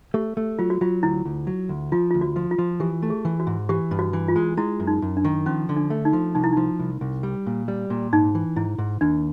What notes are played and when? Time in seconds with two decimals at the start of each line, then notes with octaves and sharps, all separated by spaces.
0.14 A3 G4
0.37 A3
0.59 F#3 F4
0.70 F#4
0.81 F#3 F4
1.03 D2 E4
1.25 D2
1.47 F#3
1.69 D2
1.92 F3 F4
2.11 D2 F4
2.21 F#4
2.36 F3
2.51 F4
2.58 F3
2.80 E3 G4
3.02 A3
3.10 G#4
3.25 E3
3.40 F#4
3.47 G#2
3.69 E3 G4
3.91 G2
3.99 F#4
4.13 E3
4.28 F4
4.36 G#3
4.57 G#3 E4
4.80 F#2
4.87 D#4
5.02 F#2
5.17 D4
5.24 D#3
5.46 F3 C#4
5.69 D3
5.76 D4
5.90 A3
6.05 D#4
6.13 F3
6.35 C2 D#4
6.44 E4
6.52 F3 D#4
6.79 C2
7.01 C2
7.23 G3
7.47 A#2
7.68 G3
7.90 A#2
8.13 G#2 D#4
8.35 E3
8.56 G#2 E4
8.78 G#2
9.01 D#2 D4